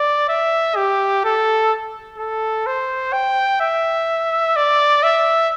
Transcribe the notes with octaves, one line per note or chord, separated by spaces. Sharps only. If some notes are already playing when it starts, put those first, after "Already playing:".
Already playing: D5
E5
G4
A4
A4
C5
G5
E5
D5
E5